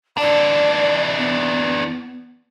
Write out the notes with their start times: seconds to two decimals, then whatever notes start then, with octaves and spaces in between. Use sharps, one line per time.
0.18 E3 D4 D5
1.18 B3